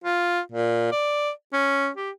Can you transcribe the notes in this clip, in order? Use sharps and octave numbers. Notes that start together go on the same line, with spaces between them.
F4
A#2
D5
C#4
G4